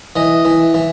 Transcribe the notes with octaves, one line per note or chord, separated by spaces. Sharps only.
E3 D#5
E3
E3